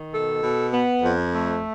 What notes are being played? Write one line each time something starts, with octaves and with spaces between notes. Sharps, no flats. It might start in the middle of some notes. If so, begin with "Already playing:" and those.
Already playing: D#3
B2 A4
B2
B3
F2
A3